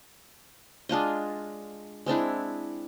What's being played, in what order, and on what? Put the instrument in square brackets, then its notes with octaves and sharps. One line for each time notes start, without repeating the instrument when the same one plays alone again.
[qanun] G#3 D4 F4 D#5
G#3 C4 D4 E4